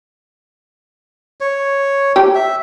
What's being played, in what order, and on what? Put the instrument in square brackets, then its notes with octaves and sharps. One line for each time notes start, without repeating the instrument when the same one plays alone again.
[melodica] C#5
[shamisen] G4
[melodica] E5